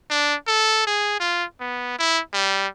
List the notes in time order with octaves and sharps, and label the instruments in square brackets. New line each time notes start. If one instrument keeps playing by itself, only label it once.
[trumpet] D4
A4
G#4
F4
B3
E4
G3